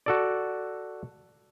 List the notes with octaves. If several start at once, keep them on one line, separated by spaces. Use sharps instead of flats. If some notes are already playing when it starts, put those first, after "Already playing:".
F#4 A4 D5